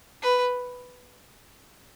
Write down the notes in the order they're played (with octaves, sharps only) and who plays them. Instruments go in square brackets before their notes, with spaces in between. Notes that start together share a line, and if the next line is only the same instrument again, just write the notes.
[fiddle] B4